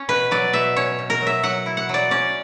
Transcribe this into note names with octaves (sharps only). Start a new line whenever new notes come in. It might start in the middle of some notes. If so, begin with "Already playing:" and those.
Already playing: C#4 C#5
B2 B4
F#3 D5
B2 E5
C#4 C#5
B2
A#4
F#3
E5
F#3 F#5
E4
F#5
F#3 D5
C#4 D5